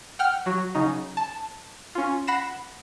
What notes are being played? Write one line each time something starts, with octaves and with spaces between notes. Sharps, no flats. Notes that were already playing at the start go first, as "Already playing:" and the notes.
F#5 G5 F6
F#3 F#4
C#3 F#3 D#4
A5
C#4 F4
F#5 B5 A#6 C7 E7